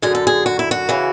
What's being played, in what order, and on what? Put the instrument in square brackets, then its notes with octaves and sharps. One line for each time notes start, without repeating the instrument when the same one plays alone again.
[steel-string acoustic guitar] F#2 D3 G#4
A4
G#4
F#4
E4
F#4
C#3 E3